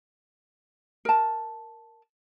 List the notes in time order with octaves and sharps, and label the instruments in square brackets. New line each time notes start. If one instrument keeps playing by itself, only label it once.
[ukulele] A#4 A5